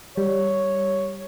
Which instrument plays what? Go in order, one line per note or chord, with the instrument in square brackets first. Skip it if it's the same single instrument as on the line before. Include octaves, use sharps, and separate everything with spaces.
[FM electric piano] G3 [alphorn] C#5